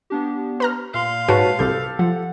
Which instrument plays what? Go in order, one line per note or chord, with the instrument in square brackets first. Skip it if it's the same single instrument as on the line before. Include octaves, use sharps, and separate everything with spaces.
[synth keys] B3 D4 G4
[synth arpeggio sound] B4 A#5 F6
[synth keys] A#2 C6 [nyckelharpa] F5
[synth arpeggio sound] G#2 F#4 [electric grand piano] B4 C#5 A5
[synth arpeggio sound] C2 G6 [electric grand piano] G4 A4
[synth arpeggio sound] F3 [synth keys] F#5